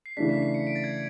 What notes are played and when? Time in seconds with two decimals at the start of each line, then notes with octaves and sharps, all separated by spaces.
0.06 C7
0.17 C#3 E3 A3 D4 B6
0.29 B6
0.43 C7
0.54 C#7
0.67 D7
0.75 A6
0.84 G#6